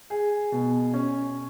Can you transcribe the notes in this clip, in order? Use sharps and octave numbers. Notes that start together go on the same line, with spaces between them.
G#4
B2
C#4